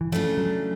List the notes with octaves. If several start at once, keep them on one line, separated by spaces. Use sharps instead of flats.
E3
C#3 E3 F3 A3 D4
F#3